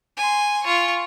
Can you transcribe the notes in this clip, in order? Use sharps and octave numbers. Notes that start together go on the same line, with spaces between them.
G#5 C6
F4 C#6